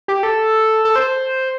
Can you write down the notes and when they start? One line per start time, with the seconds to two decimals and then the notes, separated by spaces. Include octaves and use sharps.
0.08 G4
0.23 A4
0.85 A4
0.96 C5